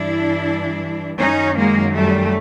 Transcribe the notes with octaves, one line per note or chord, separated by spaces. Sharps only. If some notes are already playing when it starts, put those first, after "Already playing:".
Already playing: G2 E3 D4 E4
F#2 D#3 C#4 D#4
G#3 A#3
G3 A3